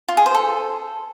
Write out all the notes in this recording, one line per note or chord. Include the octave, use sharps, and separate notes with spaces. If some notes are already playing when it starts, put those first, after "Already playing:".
F4
G#4
C5
A4